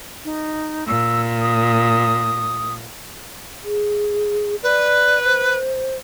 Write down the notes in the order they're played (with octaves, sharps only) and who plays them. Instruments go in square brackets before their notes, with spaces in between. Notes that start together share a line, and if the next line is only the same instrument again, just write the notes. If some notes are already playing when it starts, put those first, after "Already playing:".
[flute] D#4
[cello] A#2 [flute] E6
[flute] D#6
[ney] G#4
[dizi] B4 [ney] D5
[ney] C5